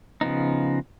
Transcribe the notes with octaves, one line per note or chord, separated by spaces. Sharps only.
C#3 F3 B3 D#4